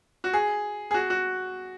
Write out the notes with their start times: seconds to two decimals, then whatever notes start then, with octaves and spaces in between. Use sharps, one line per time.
0.24 F#4
0.33 G#4
0.91 G#4
0.94 F#4
1.10 F#4